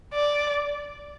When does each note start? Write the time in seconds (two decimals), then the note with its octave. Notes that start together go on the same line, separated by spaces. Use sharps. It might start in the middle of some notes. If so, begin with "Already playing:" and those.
0.14 D5